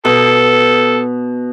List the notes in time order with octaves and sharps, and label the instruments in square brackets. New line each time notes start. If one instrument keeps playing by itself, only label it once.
[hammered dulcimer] B2 [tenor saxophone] A4